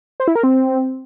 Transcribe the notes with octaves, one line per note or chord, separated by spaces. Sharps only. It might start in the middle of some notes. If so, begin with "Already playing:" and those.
C5
E4
A#4
C4